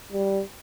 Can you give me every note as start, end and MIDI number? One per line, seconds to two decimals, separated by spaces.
0.12 0.42 55